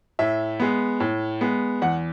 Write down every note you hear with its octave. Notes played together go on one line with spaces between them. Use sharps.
A2 E5
G#3 B3
A2
G#3 B3
E2 F#5